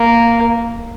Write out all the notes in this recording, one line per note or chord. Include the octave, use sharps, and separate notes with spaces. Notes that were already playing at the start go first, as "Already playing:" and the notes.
Already playing: A#3